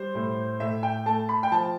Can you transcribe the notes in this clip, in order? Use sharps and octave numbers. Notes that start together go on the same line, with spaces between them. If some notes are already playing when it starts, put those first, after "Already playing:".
Already playing: G3 C5
A2
A2 E5
G5
A3 A5
B5
G5
F3 A5